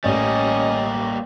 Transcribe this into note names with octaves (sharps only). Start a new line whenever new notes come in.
A1 G3 A#3 C#4 D5 D#5